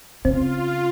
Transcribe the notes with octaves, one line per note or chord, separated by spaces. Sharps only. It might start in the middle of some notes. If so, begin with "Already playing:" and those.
C#3 C4 F4